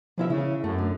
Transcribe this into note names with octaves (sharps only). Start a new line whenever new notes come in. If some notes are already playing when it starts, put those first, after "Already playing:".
D2 F3 E4 E5
C#3 E4
F#2 A3
D3